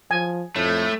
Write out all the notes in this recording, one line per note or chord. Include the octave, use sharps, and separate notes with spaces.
F3 G#5
F2 A2 A3